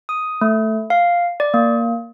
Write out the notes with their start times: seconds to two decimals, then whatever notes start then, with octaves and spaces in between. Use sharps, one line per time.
0.09 D#6
0.41 A3
0.90 F5
1.40 D5
1.54 A#3